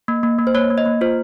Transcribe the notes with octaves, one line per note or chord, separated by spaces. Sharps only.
A#3
A#3
A#3
C5
A#3 C#5
A#3
D#5
A#3
F4 C5